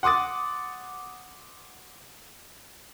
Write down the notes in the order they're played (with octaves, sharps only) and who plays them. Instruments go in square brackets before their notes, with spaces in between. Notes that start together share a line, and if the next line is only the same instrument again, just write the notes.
[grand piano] F#5 C6 D6 D#6 A6